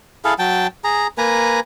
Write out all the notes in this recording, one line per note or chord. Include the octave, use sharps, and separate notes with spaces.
E4 G#4 A4 F5
F#3 G5 A5
G#4 A#5
A#3 B4 G#5 A#5